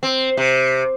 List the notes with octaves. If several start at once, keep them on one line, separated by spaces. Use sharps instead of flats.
C4
C3